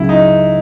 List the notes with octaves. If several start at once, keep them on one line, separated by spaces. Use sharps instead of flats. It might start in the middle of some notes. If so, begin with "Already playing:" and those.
Already playing: C#2 C#3 F#3 E4
D#4